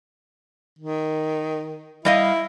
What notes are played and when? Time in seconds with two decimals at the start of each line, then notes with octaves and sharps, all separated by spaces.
0.79 D#3
2.05 G3 E4 D#5 F5